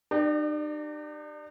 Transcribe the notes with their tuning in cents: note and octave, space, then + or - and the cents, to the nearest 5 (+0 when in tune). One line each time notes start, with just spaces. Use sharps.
D#4 -45 G4 +0 D5 +20